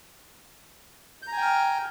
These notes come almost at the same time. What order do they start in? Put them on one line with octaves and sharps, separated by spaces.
G6 A#5 G#5 G5 F6